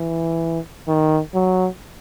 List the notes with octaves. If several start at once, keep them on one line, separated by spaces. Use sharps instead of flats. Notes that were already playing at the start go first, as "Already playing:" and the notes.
Already playing: E3
D#3
F#3